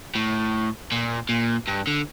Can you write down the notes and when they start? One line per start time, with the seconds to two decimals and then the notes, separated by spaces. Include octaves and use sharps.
0.15 A2
0.92 A#2
1.29 A#2
1.67 G2
1.87 D3